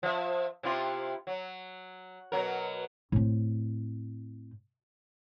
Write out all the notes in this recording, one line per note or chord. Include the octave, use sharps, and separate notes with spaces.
F3 E5
C3 E4 F4
F#3
B2 F#3 A#4
A2 C4